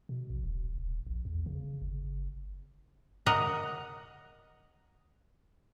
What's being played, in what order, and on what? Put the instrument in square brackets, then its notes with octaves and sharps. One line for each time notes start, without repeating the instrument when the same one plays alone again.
[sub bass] B2
A#1
D#1
D#1
A#1
E2
C#3
G1
[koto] A#4 D#5 F#5